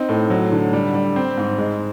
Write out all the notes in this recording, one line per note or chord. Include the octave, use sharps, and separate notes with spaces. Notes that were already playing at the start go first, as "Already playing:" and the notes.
Already playing: C4 D#4
A2
F#3
D3
G3
G3
C4
G#2
G#3